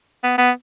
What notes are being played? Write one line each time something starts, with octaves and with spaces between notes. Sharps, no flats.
B3
B3